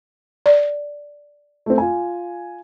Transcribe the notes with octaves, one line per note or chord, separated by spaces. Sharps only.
D5
A3 C4
F4 G#5